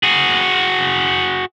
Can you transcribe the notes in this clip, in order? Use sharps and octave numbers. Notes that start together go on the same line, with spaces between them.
F#4 G#4